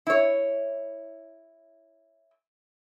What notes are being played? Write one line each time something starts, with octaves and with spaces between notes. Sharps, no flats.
E4 C#5